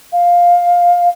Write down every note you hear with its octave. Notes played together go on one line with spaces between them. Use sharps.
F5